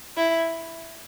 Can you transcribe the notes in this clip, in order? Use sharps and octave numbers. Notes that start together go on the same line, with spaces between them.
E4